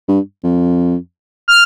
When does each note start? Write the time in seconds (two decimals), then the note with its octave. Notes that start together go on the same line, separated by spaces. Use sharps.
0.09 G2
0.44 F2
1.48 F6